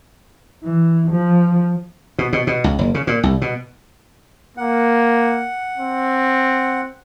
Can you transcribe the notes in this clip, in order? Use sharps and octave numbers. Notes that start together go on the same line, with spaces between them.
E3
F3
B2
B2
B2
C#2
F#1
C#3
A#2
C2
B2
A#3 F#5
C4